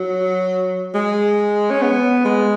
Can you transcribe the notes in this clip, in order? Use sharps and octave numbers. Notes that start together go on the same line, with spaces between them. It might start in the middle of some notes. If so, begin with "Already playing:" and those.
Already playing: F#3
G#3
C#4
B3
G#3